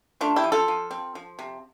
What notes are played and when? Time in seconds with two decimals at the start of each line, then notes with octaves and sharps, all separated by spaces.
0.21 A3 D4 F4
0.36 E4 G4
0.44 F3
0.52 F4 A4
0.68 F3
0.91 C4
1.15 F3
1.39 C3